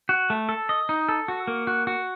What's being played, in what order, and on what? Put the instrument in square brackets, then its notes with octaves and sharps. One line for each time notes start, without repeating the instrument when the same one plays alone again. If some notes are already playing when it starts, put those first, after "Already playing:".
[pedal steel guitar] F#4
A3
A4
D#5
D#4
A4
F#4
A#3
F#4
F#4